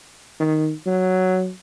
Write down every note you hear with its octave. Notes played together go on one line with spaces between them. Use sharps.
D#3
F#3